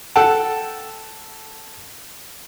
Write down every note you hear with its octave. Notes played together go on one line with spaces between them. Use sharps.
A4 F#5 G5 A5